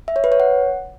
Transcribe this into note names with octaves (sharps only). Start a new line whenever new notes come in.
E5
C#5
B4
C#5
F#5